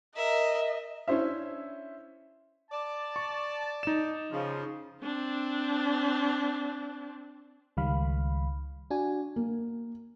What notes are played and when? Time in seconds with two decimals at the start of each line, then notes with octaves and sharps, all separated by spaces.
0.17 A#4 D#5 E5
1.08 C#4 D4 E4 C5 E5
2.71 D5 A5
3.16 C#6
3.83 D#4 E7
4.31 C#3 F3
5.03 C4 D4
7.77 C#2 D#3 G3 F5 B5
8.90 D4 F#4 G#5
9.36 A#3